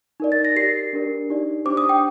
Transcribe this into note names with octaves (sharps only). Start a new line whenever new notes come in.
D#4 A#4 D5
A6
A#6
G4 A#4 D5 C7
D4 G4 A#4 D5
D#4 G4 D5
D4 G4 C5 D6
D#6
G5